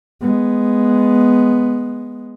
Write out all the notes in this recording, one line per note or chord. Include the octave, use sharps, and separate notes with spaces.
G#3 B3